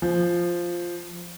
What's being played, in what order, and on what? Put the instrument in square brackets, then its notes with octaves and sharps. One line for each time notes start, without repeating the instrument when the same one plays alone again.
[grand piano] F3